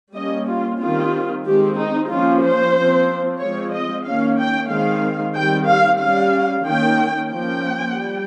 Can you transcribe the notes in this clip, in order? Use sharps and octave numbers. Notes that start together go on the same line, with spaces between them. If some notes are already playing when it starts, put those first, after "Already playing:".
G3 A#3 C#4 D#5
F4
D#3 G3 C4 F4
D#3 G#3 C4 G4
D#4
F3 A#3 C#4 F4
C5
F3 C4
F3 G#3 C4 C#5
D#5
D#3 A#3 C#4 F5
G5
D#3 G#3 C4 F5
D#3 G3 C4 G5
F5
G3 C#4 F5
D#3 A#3 C#4 G5
F3 A#3 C#4 G5
G3